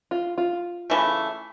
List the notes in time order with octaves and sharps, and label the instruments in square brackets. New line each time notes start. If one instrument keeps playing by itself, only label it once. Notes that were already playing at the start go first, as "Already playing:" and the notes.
[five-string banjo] F4
F4
[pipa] C#3 E3 A3